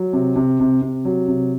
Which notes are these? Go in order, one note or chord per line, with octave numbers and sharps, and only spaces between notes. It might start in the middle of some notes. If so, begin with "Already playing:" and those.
Already playing: F#3
C3
C3
C3
C3
F#3
C3